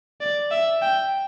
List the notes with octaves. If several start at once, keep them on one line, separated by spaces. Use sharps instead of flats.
D5
E5
G5